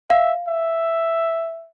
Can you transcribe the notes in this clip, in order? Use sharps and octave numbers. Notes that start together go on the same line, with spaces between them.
E5 F5
E5